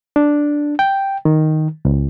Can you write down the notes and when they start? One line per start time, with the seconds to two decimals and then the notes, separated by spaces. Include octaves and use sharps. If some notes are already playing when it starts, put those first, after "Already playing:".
0.16 D4
0.79 G5
1.25 D#3
1.85 C#2